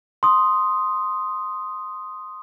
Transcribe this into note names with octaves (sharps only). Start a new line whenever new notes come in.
C6 D#6